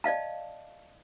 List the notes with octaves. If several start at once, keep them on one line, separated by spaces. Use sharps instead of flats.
D5 D#5 F5 A5